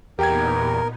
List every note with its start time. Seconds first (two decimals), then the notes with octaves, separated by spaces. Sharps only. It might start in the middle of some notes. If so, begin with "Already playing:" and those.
0.19 E2 A#2 B3 D#4 G4 A#4 G5 G#6